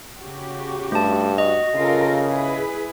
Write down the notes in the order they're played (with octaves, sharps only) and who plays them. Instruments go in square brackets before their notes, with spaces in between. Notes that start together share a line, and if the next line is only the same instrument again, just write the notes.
[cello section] C#3 F#4 G4
[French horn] G2 [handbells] A3 A5
[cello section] F#4 [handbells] D#5
[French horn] C#3 [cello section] F4 A4 A#4
[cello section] E4 G#4 B4